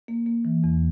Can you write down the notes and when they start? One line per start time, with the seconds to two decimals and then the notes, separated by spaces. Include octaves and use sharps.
0.08 A#3
0.26 A#3
0.45 E3
0.64 E2